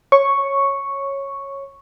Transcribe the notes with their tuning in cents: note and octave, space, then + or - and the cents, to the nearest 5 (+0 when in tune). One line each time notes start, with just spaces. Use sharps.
C#5 -10 C#6 +0